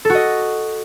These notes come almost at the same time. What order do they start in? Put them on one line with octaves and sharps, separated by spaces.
A4 F#4 D#5